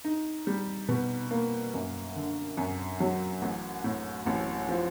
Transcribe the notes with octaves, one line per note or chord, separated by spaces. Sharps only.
D#4
G3
B2
A#3
F#2
D3
F#2
F#3
A1
A2
A1
F3